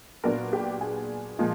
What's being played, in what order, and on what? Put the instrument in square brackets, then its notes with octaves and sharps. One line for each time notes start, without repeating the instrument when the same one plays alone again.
[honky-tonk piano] A#2 F#3 B3 D4 A#4
G4
G#4
A#2 F3 G#3